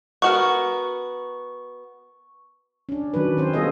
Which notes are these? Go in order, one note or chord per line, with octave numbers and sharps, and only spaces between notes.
B3 F#4 A#4 C#6
C#4 D4
D#3 F#3 D4 B4
C4 C#4 C5
G3 B3 F4 G#4 A4 D#5